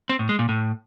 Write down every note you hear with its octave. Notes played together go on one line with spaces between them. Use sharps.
C4
A2
G#3
A#2
A2